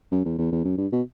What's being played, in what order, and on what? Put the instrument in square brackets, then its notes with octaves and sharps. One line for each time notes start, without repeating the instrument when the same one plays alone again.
[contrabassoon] F#2
E2
E2
E2
F#2
G2
B2